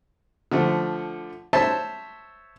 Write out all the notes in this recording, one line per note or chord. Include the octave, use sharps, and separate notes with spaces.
D3 F3 A3
C5 C#5 E5 A5 C6